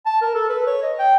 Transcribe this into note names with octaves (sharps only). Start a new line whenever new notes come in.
A5
A#4
A4
B4
C#5
D#5
G5